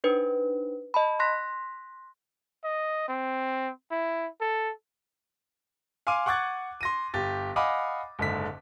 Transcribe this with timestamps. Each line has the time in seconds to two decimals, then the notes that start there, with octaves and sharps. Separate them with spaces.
0.04 D4 D#4 B4 C5
0.94 D#5 A5 B5
1.20 C6 F#6 A#6 B6
2.64 D#5
3.08 C4
3.91 E4
4.41 A4
6.07 F5 G#5 C6 D6 D#7
6.26 F#5 C#6 D6 F#6 G#6 A6
6.81 C6 A#6 D#7
7.14 G1 G4 A6
7.56 D#5 F5 F#5 G#5 B5 D6
8.19 F#1 G#2 D3 B6